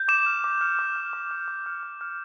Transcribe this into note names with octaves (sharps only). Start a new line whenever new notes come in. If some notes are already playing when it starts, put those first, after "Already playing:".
Already playing: G6
D6 E7
F6
D6
F6
D6
F6
D6
F6
D6
F6
D6
F6